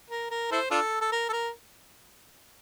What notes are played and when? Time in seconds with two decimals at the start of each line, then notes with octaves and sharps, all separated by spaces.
0.10 A#4
0.31 A#4
0.52 E4 A4 C5
0.71 D4 F4 A4
1.01 A4
1.12 A#4
1.29 A4
1.33 A#4